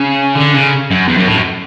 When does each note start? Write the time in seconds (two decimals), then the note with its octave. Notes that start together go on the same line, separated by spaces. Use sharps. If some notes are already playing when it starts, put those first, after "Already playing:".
Already playing: C#3
0.35 D3
0.54 C#3
0.91 F#2
1.08 E2
1.18 F#2
1.27 A2
1.36 F#2